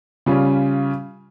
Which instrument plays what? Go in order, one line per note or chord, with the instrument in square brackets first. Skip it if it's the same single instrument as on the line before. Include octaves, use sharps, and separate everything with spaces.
[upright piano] C#3 G3 C#4 F4